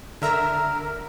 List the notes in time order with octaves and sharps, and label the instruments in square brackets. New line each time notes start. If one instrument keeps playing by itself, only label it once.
[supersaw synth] D3 E5 A#5 [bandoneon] A#4